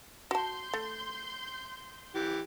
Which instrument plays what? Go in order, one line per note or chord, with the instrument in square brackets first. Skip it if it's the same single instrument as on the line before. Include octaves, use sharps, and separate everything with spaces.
[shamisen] F#4 A5 [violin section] C6 G6
[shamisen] A3
[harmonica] E3 G4